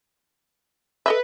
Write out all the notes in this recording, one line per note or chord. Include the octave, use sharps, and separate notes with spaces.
A4 B4 D#5 E5